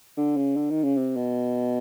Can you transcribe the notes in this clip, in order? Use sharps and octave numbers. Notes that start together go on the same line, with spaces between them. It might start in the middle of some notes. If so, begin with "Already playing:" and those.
D3
C#3
D3
D#3
C#3
C3
B2